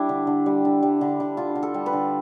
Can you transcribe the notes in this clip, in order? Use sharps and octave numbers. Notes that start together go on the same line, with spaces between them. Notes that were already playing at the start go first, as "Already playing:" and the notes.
Already playing: G3 D4 E4
D3
D3
G3
D3
G3
D3
D3
D3 F4
D3
A4
G3
B4
D3